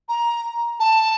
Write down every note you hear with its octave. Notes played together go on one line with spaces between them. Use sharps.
A#5
A5